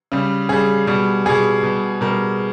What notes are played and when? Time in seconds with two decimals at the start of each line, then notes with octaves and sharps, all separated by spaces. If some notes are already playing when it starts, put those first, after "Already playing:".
0.12 C#3 G3
0.49 C#3 G3 G#4
0.87 B2 G3
1.26 B2 G3 G#4
1.63 B2 G3
2.01 B2 G3 A#4